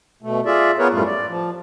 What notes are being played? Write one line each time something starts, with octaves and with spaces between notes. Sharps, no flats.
B2 A3
F4 G#4 D5 E5
B3 F4 G#4 A#4 B4 C#5
F#2 A2 G3 A3 F4
D5
F3